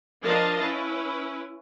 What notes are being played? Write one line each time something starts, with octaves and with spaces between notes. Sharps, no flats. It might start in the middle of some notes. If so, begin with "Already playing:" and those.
F3 D4 A#4 D#5 F5 A5
C#4 E4 B4